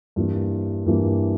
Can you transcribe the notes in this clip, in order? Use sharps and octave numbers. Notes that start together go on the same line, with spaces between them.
G2 E3 A#3
G2 E3 A#3